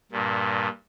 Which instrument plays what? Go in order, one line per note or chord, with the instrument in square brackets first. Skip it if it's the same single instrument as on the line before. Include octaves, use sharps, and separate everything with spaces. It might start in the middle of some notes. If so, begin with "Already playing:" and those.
[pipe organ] G2 A#2